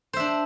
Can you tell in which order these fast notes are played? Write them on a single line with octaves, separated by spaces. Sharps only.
C5 E5 D4